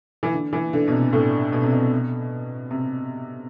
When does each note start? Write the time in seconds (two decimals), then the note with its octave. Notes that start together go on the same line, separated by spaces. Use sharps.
0.23 E3
0.33 D3
0.53 E3
0.73 D3
0.88 B2
0.92 C3
1.13 A2
1.53 B2
1.63 C3
1.72 B2
2.71 C3